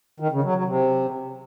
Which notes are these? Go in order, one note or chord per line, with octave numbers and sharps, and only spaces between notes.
D#3
C#3
F#3
F#3
C3